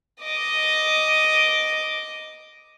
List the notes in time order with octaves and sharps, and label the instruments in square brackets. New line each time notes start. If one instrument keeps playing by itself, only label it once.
[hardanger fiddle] D#5 D6